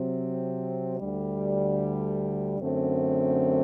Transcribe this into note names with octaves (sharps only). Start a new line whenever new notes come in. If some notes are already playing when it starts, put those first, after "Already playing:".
Already playing: C3 F#3 C4
D2 D3 G3
F#2 D3 A3 C4